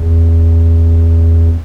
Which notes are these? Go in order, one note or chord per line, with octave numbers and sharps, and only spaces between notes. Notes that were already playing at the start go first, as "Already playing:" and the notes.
Already playing: E2